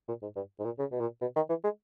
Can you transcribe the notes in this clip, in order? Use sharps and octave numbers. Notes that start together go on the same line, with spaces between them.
A#2
G#2
G2
G#2
A#2
C#3
B2
A#2
B2
D#3
E3
G#3